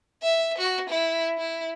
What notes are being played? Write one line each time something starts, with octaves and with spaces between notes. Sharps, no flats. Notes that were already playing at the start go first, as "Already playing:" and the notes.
E5
F#4
E4
E4